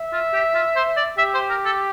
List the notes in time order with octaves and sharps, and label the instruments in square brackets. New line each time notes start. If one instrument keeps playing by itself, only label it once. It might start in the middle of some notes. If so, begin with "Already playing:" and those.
Already playing: [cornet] E5
[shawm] F4
G4
F4
C5
D5
[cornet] G4 [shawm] E5
[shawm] C5
A#4
A4